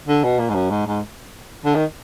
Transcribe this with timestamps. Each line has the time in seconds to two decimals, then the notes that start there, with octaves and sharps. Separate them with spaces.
0.08 D3
0.24 B2
0.39 A#2
0.49 G#2
0.54 F#2
0.70 G#2
0.87 G#2
1.65 D3
1.75 D#3